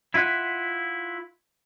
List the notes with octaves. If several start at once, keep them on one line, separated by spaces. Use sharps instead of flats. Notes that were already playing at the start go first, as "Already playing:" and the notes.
E4 F4 E5 F#5